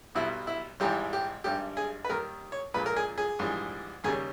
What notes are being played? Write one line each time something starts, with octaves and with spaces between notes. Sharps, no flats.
B1 B2 G3 E4
E4
G#1 G#2 E3 G3 G4
G4
G#1 G2 G3 G4
G#4
B4
D#2 D#3 G3 A#4
C#5
A#1 A#2 G#3 B4
A#4
G#4
G#4
A#1 G#2 E3 G3
D#2 C#3 G3 G#4